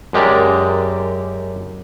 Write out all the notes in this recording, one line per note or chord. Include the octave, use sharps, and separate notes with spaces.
F#2 G#3 G4 A#4 D5